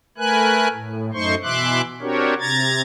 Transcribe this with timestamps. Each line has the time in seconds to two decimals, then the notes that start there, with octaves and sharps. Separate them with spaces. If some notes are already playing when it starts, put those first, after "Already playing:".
0.18 A3 A#4 B4 G#5 F#6
0.72 A2
1.14 F#2 A3 D#4 C5 C6 C#6
1.43 B2 E3 E5 C6 D6 F#6
2.01 C4 D4 F#4 G4 A#4 C#5
2.40 C3 A#5 G#6 A6